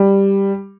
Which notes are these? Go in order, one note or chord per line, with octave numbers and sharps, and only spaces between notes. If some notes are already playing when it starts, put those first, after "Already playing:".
Already playing: G3